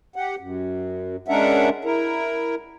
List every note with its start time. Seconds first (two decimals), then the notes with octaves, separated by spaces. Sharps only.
0.16 G4 F#5
0.39 F#2
1.28 G#3 C#4 D4 A#4 E5 F#5
1.85 E4 A#4